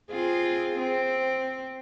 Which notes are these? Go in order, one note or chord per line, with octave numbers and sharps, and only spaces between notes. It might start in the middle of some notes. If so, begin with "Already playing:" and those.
C4 F4 G#4
C4